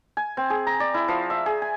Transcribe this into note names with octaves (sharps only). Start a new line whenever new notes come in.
G#5
C4
G#4
A#5
D5
E4
F3
E5
G#4
G#5